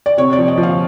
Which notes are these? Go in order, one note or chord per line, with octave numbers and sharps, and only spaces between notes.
D5
C3 C#5
D5
F3
D#5
F3
F5